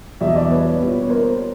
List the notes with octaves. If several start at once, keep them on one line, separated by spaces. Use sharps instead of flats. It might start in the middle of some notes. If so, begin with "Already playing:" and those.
E2 B2 G3 D5 E5
D#5
D5 E5
B4 C#5
A#2 G3 B3
C#5
A#4 C5